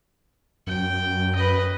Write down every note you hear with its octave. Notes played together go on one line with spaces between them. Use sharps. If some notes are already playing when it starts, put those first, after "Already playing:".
F#2 G5
B4 D#5